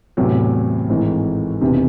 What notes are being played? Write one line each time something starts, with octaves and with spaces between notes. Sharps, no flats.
E2 A2 C3 F#3
G#1 G#2 E3
E1 E2 C3 D#3